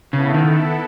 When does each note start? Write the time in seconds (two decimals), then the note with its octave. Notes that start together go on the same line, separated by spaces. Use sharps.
0.13 C#3 B3 E4 A4
0.34 D#3